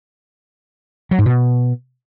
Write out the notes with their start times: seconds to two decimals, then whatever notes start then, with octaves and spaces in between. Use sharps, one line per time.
1.11 F#3
1.19 G#2
1.26 B2